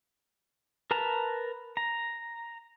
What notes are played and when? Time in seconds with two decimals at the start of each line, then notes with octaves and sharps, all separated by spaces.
0.91 A#4 B4 A5 A#5
1.77 A#5